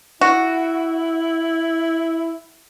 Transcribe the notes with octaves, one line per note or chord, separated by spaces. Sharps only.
E4 F#4